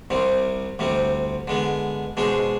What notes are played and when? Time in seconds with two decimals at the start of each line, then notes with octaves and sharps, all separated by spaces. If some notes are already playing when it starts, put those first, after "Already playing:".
0.10 C2 C3 G3 C4
0.79 D2 C3 G3 C4
1.48 D3 G#3 B3
2.17 B2 G#3 D4 G#4 C5